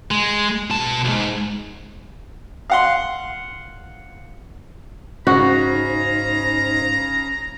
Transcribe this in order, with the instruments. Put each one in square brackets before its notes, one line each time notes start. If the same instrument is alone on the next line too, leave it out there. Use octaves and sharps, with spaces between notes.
[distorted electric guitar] G#3
B2 A5
B1 G#2
[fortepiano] F5 F#5 C6
[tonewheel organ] G#2 D#4 C5 [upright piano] C#3 [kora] F#4 [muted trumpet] A#5